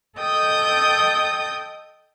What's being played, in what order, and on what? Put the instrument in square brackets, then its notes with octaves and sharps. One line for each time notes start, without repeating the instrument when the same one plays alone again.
[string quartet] A4 D#5 G5 D#6 G6